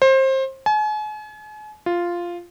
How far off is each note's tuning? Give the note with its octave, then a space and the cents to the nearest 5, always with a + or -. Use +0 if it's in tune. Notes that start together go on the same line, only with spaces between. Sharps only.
C5 +25
G#5 +40
F4 -5